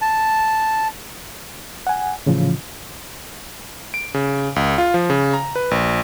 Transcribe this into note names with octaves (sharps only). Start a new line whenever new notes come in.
A5
F#5 G#5
A2 C#3 E3 F3 F4
D7
C#3
C#2
F4
F3
C#3
A#5
B4
A#1